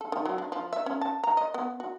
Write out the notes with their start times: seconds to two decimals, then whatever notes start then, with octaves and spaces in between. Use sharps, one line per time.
0.01 A4
0.12 D#3
0.25 F#3
0.38 D4
0.52 F3
0.73 E5
0.86 C#4
1.01 A5
1.24 A#5
1.37 D#5
1.54 B3
1.80 F#4